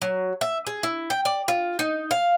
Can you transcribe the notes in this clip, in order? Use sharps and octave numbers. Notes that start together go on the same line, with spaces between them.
F#3
E5
G#4
E4
G5
D5
F4
D#4
F5